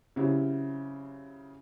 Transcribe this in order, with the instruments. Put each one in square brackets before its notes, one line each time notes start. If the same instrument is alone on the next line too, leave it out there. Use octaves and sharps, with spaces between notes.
[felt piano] C#3 F#3 C4 E4 G4